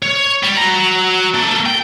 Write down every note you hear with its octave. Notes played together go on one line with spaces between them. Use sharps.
C#5
G3
F#4 A#5
A#3 A4
G5